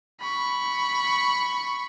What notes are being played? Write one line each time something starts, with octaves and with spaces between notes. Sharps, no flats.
B5 C#6